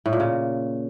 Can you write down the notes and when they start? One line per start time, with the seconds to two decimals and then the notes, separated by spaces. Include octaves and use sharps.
0.06 A2
0.13 A#2
0.20 C#3